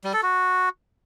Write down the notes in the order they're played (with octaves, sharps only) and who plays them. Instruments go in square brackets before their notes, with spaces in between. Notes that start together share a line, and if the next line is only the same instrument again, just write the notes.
[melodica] G3
A4
F#4